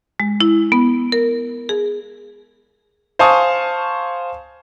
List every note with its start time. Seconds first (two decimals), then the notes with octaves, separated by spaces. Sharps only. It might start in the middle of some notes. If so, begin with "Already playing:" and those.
0.20 G#3
0.41 E4
0.72 B3
1.12 A#4
1.69 G#4
3.19 C5 F5 G#5 A5 C#6 D#6